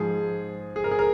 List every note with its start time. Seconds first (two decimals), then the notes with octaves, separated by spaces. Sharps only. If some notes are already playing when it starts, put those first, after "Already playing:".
Already playing: G#2 F3 G#4
0.76 G#4
0.84 A#4
0.91 G#4
0.99 A#4